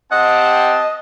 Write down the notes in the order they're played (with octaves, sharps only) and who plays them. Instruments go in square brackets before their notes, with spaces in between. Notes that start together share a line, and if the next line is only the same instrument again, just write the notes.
[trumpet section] C4 G4 A5 [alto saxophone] D#5 [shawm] F#5